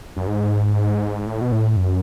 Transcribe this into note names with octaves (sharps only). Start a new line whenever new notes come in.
F#2
G#2
A2
B2
A2
F#2